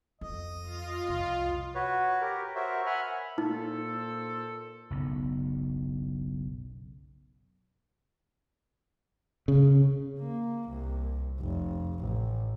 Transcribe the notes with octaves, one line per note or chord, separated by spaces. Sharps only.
F2 D#5
F4
C2 F2
F#4 B4 C#5
G4 A#4
F#4 A#4 C5 C#5 E5
E5 F#5 G#5 B5 F6
A#2 D#4 A4 C5
F#1 B1
C#3
A#3
C2
F1
A1